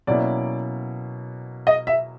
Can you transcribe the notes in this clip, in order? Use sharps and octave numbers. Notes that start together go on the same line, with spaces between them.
B2 F#3 A#3 C#4 E4 D5
D#5
E5